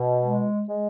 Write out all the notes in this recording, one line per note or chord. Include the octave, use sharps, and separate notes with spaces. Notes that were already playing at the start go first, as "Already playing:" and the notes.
Already playing: B2
G#3
G#3